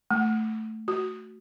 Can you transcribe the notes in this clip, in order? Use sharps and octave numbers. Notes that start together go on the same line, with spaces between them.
A3
F#4